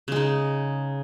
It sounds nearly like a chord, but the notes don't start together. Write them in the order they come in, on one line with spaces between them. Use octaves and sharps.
C#3 G#3 D#4